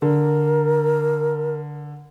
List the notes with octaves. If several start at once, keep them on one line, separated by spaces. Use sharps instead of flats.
D3 A#4